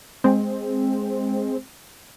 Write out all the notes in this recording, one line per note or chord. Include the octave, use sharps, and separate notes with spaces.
G#3 C4